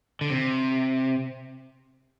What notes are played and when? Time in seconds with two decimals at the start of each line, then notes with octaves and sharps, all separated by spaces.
0.21 D3
0.30 C3